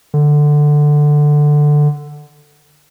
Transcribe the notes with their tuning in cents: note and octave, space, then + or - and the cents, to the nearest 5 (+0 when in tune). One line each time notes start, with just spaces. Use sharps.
D3 +10